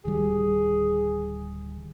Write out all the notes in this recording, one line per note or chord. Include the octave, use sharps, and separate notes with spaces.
D1 D#3 G3 G#4